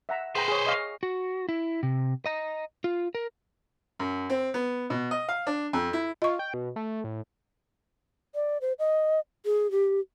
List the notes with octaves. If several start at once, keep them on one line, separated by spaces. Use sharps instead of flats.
E5 F#5 A#5
G#4 B4 C5 G5 A#5
G#4 C#5
D#5 F5 C#6
F#4
E4
C3
D#5 A#5
F4
A#4
F#2
C4
B3
B2
D#5
F5
D4
F2
E4
F4 D#5 C#6
G5
B2
A3
A2
D5
C5
D#5
G#4
G4